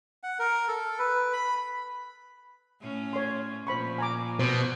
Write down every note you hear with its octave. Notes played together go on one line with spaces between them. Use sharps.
F#5
A#4
A4
B4
B5
A2 C#4
C#5 C6
A#2 F3 C5 B5 C#6
G#5 A#5 D6
B2 C5